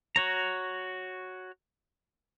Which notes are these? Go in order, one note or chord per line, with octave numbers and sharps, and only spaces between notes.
F#4 C#5 A#5